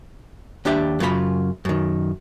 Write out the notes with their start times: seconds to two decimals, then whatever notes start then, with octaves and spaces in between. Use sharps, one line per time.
0.65 D#2 D4 G4 D5 E5
1.00 F#2 C#3 F4 A#4 B5
1.65 F#2 D#3